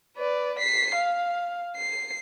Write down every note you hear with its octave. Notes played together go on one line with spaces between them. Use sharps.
B4 D5
B6 C7
F5
C7